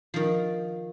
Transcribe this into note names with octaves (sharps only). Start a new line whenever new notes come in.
D#3 F3